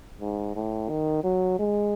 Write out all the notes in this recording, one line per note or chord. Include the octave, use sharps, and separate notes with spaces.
G#2
A2
D#3
F#3
G#3